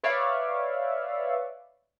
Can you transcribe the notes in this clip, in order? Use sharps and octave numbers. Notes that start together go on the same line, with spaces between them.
B4 C#5 D5 E5 F5